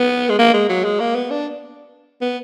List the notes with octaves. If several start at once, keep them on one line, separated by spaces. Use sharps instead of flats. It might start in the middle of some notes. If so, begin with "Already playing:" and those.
Already playing: B3
G#3
A#3
G#3
F#3
G#3
A#3
B3
D4
B3